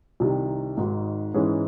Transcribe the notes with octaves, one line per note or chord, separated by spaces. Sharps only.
C2 C3 D#3
G#1 G#2 D#3
G#2 E3 G#3 C#4